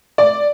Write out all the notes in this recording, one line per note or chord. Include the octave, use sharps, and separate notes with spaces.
D5